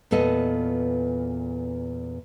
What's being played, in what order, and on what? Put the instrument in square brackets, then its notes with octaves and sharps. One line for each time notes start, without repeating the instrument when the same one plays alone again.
[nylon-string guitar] E2 A#2 B3 A4 D#5